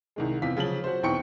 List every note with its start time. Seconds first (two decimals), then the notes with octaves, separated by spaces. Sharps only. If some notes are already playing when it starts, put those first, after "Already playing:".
0.16 C2 D#3 G#3
0.42 E2 C3 F4 B6
0.57 C#3 F3 F#3 F#7
0.84 F#4 C5
1.03 B1 E2 C4 G5 C#6 C#7